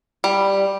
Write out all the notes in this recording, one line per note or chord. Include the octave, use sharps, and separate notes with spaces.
G3